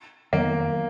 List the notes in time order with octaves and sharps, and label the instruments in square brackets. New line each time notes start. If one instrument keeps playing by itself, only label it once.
[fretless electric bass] F2 D#3 F#3 B3 [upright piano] A#3